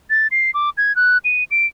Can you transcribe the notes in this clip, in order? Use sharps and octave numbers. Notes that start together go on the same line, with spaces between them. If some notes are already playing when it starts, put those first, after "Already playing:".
A6
C7
D6
G#6
F#6
D#7
D7